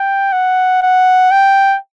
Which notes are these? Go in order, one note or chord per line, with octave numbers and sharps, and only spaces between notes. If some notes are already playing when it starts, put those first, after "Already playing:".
Already playing: G5
F#5
F#5
G5